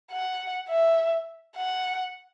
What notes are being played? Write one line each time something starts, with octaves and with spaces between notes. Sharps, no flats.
F#5
E5
F#5